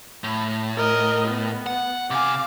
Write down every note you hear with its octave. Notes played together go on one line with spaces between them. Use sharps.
A2
A#4 D#5
B3
F#5
C3 F5 G#5 D6